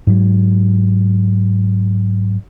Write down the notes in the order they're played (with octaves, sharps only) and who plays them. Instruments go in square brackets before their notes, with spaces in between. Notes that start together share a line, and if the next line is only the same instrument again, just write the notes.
[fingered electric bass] G#2 F#3